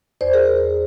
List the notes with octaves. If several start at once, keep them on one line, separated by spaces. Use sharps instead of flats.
E2 C5 D5
G#4 A#4